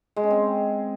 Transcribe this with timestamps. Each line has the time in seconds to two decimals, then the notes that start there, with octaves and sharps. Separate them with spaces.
0.16 G#3
0.23 C#4
0.31 C4